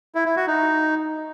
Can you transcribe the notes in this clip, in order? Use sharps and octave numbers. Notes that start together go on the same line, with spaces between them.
E4
E4
F#4
D#4